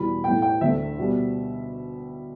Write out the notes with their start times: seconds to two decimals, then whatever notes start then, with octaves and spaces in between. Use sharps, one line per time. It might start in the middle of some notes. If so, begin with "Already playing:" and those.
Already playing: E2 B2 G3 B5
0.24 A2 A3 G5
0.42 G5
0.61 D2 D3 A3 E5
0.98 B2 G3 B3